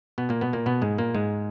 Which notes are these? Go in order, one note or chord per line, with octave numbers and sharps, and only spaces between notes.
B2 B3
A#2 A#3
B2 B3
A#2 A#3
B2 B3
G#2 G#3
A#2 A#3
G#2 G#3